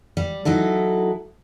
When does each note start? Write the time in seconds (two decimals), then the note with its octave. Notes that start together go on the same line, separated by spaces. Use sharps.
0.17 G3
0.45 F#3 D#4 E4 A4